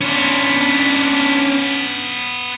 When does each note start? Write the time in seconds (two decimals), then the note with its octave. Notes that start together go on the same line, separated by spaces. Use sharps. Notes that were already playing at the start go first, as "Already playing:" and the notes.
0.01 B3 C#4 D4 F4